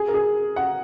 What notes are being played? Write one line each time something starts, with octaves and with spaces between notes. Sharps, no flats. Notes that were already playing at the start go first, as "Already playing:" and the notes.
Already playing: G#4
A#4
G#4
F#5